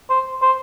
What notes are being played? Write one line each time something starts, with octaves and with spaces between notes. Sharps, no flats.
C5
C5